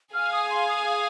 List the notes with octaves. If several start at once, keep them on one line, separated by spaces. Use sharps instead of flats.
G#4 F5 G#5 F6
D#6
C6
D#6
D#6